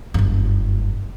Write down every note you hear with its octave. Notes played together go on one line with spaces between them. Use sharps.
F#1 G2